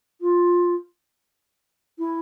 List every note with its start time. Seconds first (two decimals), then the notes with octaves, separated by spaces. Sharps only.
0.21 F4
1.98 E4